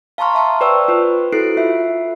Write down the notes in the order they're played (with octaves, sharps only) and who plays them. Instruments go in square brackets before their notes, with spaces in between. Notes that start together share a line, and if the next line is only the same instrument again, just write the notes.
[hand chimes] F5 A5 A#5 C6 C#6 F6
E5 A5 C6 C#6
B4 C5 D5 G5 C#6 E6
F4 B4 C5
E4 F#4 A4 F#6 C7 D7
F4 E5